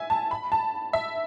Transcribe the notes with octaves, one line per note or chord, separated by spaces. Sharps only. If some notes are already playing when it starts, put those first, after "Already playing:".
Already playing: E5 G#5
A5
B5
A5
E5